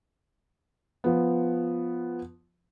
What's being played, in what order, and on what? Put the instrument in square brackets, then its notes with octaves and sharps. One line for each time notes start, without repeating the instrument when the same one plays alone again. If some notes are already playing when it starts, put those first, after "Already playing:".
[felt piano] F3 B3